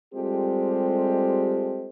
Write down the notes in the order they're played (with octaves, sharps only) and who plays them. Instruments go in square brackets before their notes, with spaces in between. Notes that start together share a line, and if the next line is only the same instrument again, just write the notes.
[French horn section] G3 G#3 C4 F4 G4 A4